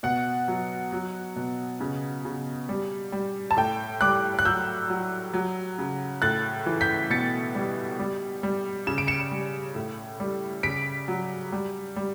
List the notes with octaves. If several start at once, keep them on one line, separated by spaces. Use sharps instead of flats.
B2 F#5
F#3
F#3
B2
C#3
C#3
G3
G3
A5
A2 G5
G3 D6 F#6
F#6
F#3 E6 G6
F#3
F#3
C#3
A2 F#6 A6
E3
G6 B6
B2 A6 C#7
G3
G3
G3
C#3 E7
D7
C#7 E7
G3
A2
G3
C#3 B6 D7
F#3
G3
G3